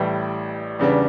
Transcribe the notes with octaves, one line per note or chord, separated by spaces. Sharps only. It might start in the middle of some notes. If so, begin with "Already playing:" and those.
Already playing: A1 A2 G3
E2 C#3 G3 B3 D4